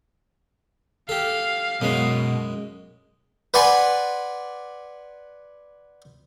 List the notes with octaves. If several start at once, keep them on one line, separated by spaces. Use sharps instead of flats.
G4 A4 F5
F#2 B2 G#3 C#4
B4 D5 F#5 G#5 C6